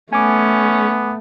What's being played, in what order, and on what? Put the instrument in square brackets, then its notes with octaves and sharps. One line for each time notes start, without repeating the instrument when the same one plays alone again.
[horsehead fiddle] A3 [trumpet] B3 [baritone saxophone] C#4 [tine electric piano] G#5 D6